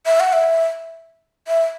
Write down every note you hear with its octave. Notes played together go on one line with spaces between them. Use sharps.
E5
F#5
E5
E5